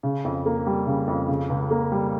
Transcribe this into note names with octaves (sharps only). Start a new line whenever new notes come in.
C#3
F2
A#3
G3
C#3
F2
C#3
C#2
A#3
G3